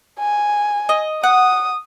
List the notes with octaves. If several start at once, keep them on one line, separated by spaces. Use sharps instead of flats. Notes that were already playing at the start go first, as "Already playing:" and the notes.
G#5
D#5
F#5 D#6